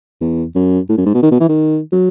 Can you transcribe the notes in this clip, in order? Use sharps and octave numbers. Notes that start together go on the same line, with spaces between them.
E2
F#2
A2
F#2
G#2
B2
D#3
B2
E3
D#3
F#3